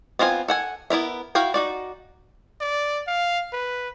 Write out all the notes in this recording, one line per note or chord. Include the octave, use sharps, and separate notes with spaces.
B3 C4 F4 E5 G#5
A4 F#5 G#5
B3 E4 A#4 E5
E4 F#4 F5 G5
D#4 F#4 D5
D5
F5
B4